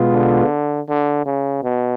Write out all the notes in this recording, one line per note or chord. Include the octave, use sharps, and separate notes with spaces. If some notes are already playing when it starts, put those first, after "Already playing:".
Already playing: B2 G#3 B3 F4
D3
D3
C#3
B2